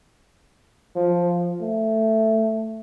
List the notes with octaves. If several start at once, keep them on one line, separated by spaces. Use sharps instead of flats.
F3
A3